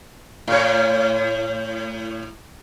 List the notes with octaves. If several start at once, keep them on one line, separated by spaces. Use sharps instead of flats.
A2 C#5